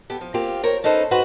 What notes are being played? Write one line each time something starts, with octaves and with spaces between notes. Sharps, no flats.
B3 G4 A4
F3
A#3 C4 F4 G4
A#4 C5 C#5
C#4 D#4 A4 B4 C5
G#2 F#4 B4 C5 F#5 A#5